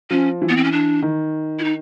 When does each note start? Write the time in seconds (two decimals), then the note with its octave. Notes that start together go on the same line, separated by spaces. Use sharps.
0.10 F3 C#4
0.42 E3
0.49 B3
0.57 C4
0.64 C#4
0.72 D4
1.02 D#3
1.59 E4
1.64 D#4